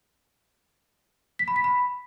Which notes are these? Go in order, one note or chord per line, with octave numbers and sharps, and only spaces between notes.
B6
B5
B6
B5